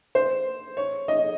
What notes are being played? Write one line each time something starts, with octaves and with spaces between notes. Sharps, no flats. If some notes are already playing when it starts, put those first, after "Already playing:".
C5
C#5
D#5